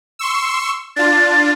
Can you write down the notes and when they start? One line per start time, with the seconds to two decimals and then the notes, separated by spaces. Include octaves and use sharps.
0.19 C6 C#6 E6
0.96 D4 F4 A6